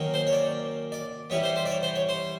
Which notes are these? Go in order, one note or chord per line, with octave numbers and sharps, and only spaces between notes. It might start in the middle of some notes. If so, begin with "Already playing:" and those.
Already playing: D#3 F#3 A#3 C#4
C5
C#5
D5
D5
E3 G3 B3 C#5
C5
C5
D5
C#5
C5
C#5
C5